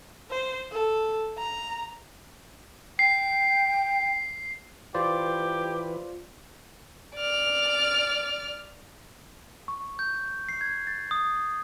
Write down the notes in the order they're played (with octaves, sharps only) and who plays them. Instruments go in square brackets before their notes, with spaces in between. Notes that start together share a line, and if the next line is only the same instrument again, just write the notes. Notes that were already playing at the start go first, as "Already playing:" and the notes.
[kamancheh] C5
A4
A#5
[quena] G5 [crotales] C7
[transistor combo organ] E3 B4 [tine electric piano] F4 C5 D5 [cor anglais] G4
[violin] D5 F6
[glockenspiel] C#6
G6
C7
G#6
A6
D#6